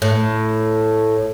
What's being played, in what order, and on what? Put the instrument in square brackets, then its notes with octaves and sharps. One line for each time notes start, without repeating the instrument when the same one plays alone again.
[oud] A2